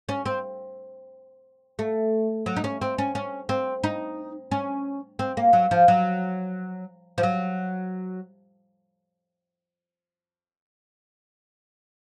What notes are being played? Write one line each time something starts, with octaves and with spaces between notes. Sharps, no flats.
C#4
C4
A3
F#3
D#4
C#4
C4
C#4
C#4
C4
D#4
C#4
C4
A#3
F#3
F3
F#3
F3
F#3